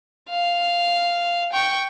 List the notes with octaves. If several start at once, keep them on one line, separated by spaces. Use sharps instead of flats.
F5
G5 C#6